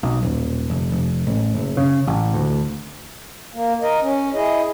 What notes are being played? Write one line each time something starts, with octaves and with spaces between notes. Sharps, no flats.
B1
D#1
F1
F1
A1
F#1
C#3
A1
D2
A#3
A#4 D#5
C#4
E4 G#4 D#5